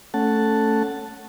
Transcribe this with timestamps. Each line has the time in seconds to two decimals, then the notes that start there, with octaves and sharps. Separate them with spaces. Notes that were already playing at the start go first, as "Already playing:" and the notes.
0.14 A3 C#4 F#5 A5